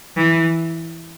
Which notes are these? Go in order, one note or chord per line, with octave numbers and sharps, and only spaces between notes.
E3